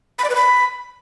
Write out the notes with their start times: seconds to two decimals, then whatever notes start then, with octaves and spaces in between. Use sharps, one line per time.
0.19 B5
0.24 D5
0.30 B4
0.35 B5